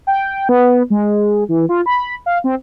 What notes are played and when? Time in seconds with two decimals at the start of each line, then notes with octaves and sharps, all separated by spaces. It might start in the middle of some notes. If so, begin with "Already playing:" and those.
0.07 G5
0.49 B3
0.90 G#3
1.49 E3
1.69 F4
1.86 B5
2.26 F5
2.44 C4